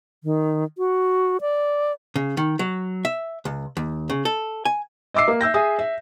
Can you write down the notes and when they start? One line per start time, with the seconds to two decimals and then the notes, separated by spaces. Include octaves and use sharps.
0.24 D#3
0.78 F#4
1.41 D5
2.16 C#3
2.37 D#3
2.59 F#3
3.05 E5
3.45 C#2
3.77 D#2
4.10 C#3
4.25 A4
4.65 G#5
5.14 D#5 E5 D6 E6 C7
5.28 A#3
5.41 E5 E6 G6 A#6
5.54 G#4 E5 D#6
5.79 E5